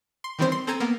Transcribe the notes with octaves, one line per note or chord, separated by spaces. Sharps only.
C6
D#3 E3 G3 C4 C5
C6
C4 A4 A#5 G#6 D#7
A#3 B3